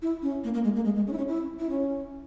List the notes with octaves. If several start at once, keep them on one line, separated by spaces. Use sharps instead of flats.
E4
C#4
A#3
A#3
G#3
A#3
G#3
G#3
C#4
E4
C#4
E4
E4
C#4